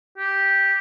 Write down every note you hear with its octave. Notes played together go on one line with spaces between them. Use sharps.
G4